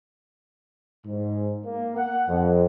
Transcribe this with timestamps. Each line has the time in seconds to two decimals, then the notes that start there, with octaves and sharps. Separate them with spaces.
1.05 G#2
1.65 A#3
1.96 F#5
2.28 F2